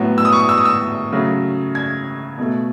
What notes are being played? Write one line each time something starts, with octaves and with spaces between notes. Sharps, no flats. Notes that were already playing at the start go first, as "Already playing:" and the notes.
Already playing: A2 F#3 B3
E6
D#6
C#6
D#6
E6
D#6
E6
C#3 F#3 A3
G#6
B2 A3